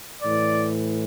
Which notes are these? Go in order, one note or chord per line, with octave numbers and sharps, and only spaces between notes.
A2 E3 D5